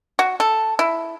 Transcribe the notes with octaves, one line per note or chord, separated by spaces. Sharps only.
F#4
A4
E4